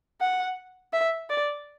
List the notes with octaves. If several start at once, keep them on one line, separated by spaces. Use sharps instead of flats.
F#5
E5
D5